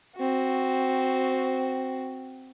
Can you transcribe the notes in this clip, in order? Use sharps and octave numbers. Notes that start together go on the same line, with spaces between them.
C4 F#4